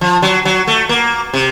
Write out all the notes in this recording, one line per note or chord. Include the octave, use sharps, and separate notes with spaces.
F3
F#3
F#3
A3
A#3
C3